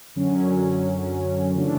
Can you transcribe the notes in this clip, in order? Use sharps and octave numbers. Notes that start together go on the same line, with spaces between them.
F#2 D3 F#3 C#4
C#3 E3 A3 D4